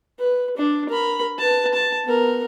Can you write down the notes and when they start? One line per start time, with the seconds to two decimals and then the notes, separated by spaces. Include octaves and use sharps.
0.19 B4
0.57 D4
0.89 A#4 B5
1.39 B4 A5
1.74 A5
2.04 B3 A#4